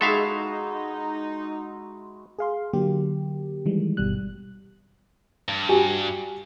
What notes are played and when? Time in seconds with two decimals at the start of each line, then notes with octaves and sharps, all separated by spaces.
0.01 G#3 D#4 E4 F#4 A4 E5 F5
2.39 G#4 F5 C6
2.73 D3 F#3 A#3 G4
3.65 D#3 E3 G3 G#3
3.97 G1 B2 G3 F#6
5.48 G2
5.69 F#4 G4 G#5